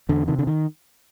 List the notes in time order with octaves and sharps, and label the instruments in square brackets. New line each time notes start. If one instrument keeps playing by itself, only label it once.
[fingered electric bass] E2 D3
C3 D#3
D3
D#3